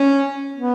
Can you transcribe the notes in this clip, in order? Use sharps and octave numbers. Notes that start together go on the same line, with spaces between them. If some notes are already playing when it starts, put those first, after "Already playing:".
Already playing: C#4
B3